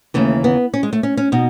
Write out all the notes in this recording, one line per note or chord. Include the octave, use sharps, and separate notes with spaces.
D#2 C#3 E3 A3
B3
C#4
G#3
A3
C#4
C#4
B2 D#4